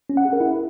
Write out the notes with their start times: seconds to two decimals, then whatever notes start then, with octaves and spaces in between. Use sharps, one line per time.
0.10 C#4
0.17 F#5
0.25 G#4
0.33 A#4
0.40 E4